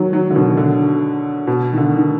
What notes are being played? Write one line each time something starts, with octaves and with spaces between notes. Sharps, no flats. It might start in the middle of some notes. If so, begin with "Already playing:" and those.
Already playing: D#3 F#3
D#3 F#3
D3
B2 D#3
D3
B2
D#3
D3
D#3